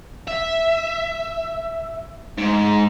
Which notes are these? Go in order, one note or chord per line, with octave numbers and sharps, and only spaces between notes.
E5
G#2